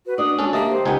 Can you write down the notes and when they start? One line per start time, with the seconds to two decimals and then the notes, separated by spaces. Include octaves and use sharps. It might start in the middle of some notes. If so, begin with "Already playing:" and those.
0.06 F#4 B4
0.18 D4 D5 D#6
0.39 G#3 C#4 D4 G#4 A4
0.53 D3 A#3 G4 D#5 E5 A5
0.70 C5
0.85 C#2 B3 D#4 G5 G#5